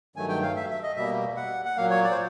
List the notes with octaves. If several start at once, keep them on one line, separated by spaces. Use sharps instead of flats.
G2 D#3 F#3 A3 G#5
G5
F5
E5
E5
D#5
B2 G3 A#3 E5
F#5
F#5
A#2 F#3 A#3 F5
C#5
D5
C5